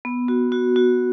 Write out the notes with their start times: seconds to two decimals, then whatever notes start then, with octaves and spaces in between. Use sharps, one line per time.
0.05 B3
0.28 F#4
0.52 F#4
0.76 F#4